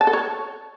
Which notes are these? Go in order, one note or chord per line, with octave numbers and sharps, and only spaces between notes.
A5
A4
C#5